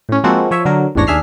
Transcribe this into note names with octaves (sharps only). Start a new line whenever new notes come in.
A2 C#4
F3 G#3 A#3 C4 F#4 A4
F3 C#5 E5
D3 F#3 A#4
A1 E2 G#2 D4 C#5 A#6
D#2 D4 G#4 E5 F6 C7